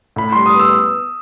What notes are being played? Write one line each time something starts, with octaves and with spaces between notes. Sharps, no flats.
A2 B5
G3 C6
D#6
B3 E6